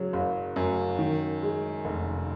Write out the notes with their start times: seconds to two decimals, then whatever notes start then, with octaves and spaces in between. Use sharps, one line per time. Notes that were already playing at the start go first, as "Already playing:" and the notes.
Already playing: C#3 F#3
0.13 F#1
0.56 F#2
0.99 D#3
1.42 G#3
1.85 F1